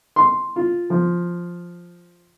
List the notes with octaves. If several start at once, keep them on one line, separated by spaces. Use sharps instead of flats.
C6
F4
F3